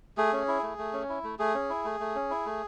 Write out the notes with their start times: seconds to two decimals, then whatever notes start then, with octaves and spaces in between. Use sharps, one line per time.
0.18 A3 G#4
0.33 C#4
0.48 E4
0.63 A3
0.78 A3
0.93 C#4
1.09 E4
1.24 A3
1.39 A3 G#4
1.55 C#4
1.70 E4
1.85 A3
2.00 A3
2.15 C#4
2.31 E4
2.46 A3